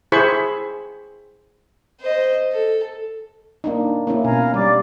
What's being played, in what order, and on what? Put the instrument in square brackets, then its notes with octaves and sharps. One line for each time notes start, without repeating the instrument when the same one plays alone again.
[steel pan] E4 G#4 C5 B5 C#6
[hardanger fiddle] C5 D#5
A4
[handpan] A#3 D4 D#4
A#3 C#4 E4
[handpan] B2 [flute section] F5 G#5 A#5
[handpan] G3 [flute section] D5 D6